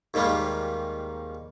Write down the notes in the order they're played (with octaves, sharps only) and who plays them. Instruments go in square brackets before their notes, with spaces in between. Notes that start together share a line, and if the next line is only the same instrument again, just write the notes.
[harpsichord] D#2 G#2 D#3 G3 A#3